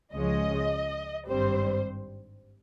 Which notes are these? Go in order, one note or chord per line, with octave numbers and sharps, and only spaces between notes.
C#2 C#3 F3 G#3 C#4 D#5
G#1 G2 G3 C4 C5